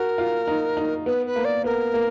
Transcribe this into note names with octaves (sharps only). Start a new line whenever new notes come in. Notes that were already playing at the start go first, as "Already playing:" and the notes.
Already playing: F#4 A#4
F4
D#4
D#4
B3 B4
B4
A#3
D5
B3 A#4
A#3